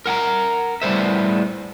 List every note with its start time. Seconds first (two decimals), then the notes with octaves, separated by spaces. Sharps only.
0.06 A#4 F#5 G5 A#5
0.82 A2 G3 B3 C5 E5